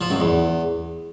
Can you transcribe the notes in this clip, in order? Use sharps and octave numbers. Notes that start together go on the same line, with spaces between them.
F3
F#2
E2